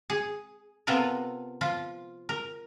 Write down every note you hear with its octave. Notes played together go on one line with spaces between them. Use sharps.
G#4
C3 B3 F4 A4 A#4
F3 F4
A#4